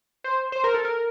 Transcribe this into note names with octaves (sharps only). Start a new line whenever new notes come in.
C5
C5
A#4
A4
A#4